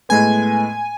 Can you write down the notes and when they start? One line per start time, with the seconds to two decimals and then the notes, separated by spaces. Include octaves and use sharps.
0.09 A2 G#3 B3 G#5